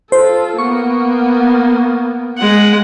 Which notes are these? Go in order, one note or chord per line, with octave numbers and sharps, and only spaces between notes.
F4 A4 C5
A#3 B3 C#6
G#3 F#5